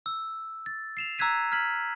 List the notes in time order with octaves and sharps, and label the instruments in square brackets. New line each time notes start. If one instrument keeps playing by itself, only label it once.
[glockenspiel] E6
A6
C7 E7 F7
A#5 E6 F#6 G#6 B6 D#7
F6 G#6 B6 F#7